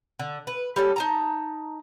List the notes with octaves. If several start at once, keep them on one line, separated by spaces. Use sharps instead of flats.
D3
B4
G3 C#4 A4
D#4 A5 A#5